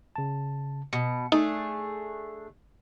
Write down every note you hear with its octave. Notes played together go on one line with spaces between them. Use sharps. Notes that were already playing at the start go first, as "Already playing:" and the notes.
C#3 A5
B2 C#7
A3 D4 D#4 G#4